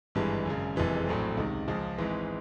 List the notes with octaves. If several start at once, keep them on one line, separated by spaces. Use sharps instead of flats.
G#1 G2 E3 G#3
G#1 F#2 C#3
F#1 F2 C3 E3 G#3
A#1 A2 F#3 A3 C4
C#2 C3 D#3
C#2 C#3 F3
G#1 G#2 E3 G#3